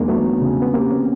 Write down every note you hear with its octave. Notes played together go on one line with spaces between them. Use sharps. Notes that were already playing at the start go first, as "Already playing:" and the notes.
Already playing: E2 G#3 A#3 C4 D4 D#4
F#3 A3 B3
C#3
B3
A#3 C4 G4
B3 C#4